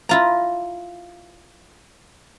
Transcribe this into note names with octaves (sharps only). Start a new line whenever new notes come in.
E4 F4 A#5